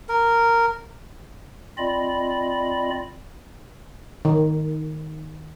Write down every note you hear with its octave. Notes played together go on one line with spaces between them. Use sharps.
A#4
C4 F4 D5 D#5 B5
D#3